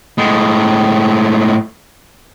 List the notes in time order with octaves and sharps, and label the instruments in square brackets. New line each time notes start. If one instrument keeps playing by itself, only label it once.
[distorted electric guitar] A2 G#3